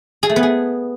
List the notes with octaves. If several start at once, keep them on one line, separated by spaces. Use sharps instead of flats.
G#4
A3
B3
G#4